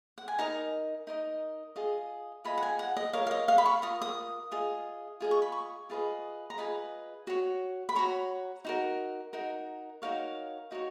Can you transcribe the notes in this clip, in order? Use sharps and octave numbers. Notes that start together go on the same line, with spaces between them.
F#5
G#5
D#4 A#4 D#5 A#5
D#4 A#4 D#5
F4 G#4 D#5
F4 G#4 D#5 B5
F#5
G#5
F#5
D#5
F4 A#4 C#5 F5
F5
D#5
F5
B5
C#6
F4 A#4 D#6
D#6
F4 G#4 D#5
F4 G#4 D#5
C#6
B5
C#6
F4 G#4 B4 D#5
A#5
F4 G#4 B4 D#5 B5
F#4 C#5
B5
F#4 C#5 A#5
D#4 F#4 A#4
D#4 F#4 A#4
D#4 F#4 A#4 C#5 F5
D#4 F#4 A#4 C#5